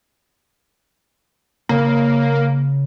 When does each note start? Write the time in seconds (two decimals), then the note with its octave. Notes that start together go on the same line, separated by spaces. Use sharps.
1.69 C#3 A#3